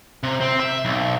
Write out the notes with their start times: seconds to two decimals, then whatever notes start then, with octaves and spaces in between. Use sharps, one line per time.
0.23 C3
0.41 C4
0.60 E5
0.85 B1